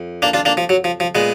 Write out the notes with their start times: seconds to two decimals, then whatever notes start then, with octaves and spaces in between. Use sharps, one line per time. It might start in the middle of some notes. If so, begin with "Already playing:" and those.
Already playing: F2
0.22 A#3 D4
0.34 D4 F4
0.45 A#3 D4
0.57 F3
0.69 F#3
0.84 F3
1.00 F3
1.15 A#2 G#3 B3